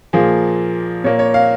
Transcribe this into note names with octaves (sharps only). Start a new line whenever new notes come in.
A#2 F3 A#3 G#4
A#2 A#3 C#5
C#5
F5